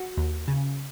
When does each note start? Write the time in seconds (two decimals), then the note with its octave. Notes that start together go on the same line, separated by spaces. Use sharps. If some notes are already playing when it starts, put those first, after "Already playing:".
Already playing: F#4
0.17 D#2
0.48 C#3